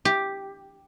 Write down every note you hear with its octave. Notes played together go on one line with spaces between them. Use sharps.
G4